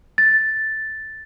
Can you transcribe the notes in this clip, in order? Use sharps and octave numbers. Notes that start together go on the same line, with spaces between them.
A6